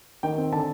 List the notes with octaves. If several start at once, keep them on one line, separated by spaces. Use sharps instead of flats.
D#3 G5
C4
D3 A5